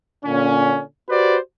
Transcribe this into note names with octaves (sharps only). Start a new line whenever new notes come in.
A#2 D3 C#4
F#4 G4 B4 C5 D5